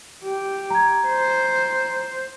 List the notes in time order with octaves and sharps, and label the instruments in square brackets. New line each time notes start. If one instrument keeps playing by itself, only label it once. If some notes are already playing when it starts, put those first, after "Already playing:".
[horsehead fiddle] G4
[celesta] A#5 G#6
[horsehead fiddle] C5